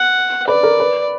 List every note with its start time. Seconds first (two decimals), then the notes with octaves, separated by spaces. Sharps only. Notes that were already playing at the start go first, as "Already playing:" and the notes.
Already playing: F#5
0.47 B4 D5
0.63 A#4
0.80 B4